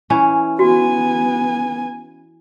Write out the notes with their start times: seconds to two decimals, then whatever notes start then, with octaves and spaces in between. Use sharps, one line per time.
0.10 E3 C#4 E4
0.59 B3 F#4 G#5